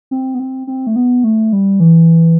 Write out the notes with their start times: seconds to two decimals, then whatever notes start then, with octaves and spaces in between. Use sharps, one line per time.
0.11 C4
0.34 B3
0.39 C4
0.67 C4
0.87 A3
0.96 B3
1.24 A3
1.53 G3
1.80 E3